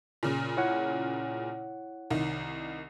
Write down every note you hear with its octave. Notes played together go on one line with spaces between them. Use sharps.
A#2 C#3
E4 C#5 F#5
C2 D#3